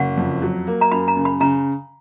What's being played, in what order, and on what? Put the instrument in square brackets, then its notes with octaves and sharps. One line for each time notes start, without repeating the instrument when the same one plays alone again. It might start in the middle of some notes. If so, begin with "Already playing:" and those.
Already playing: [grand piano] F#1 [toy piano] F#5
[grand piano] F2
F#3
A#3
[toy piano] A#5
[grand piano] F#2 [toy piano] B5
[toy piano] A#5
[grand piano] C#3
[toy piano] B5
[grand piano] C#3 [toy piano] A#5